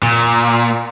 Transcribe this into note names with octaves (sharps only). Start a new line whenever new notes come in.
A#2